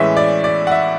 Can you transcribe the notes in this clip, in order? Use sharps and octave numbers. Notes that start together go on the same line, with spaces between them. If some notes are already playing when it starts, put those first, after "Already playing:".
Already playing: A2 E3 G#3 C#4 E5
D5
D5
F#5
E5